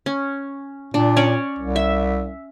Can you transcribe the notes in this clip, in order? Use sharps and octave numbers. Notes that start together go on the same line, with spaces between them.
C#4
A#2 D4
C#4 C#5 D5
C2
E5